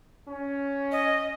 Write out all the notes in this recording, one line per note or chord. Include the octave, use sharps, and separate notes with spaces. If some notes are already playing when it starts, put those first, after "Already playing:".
C#4
D#5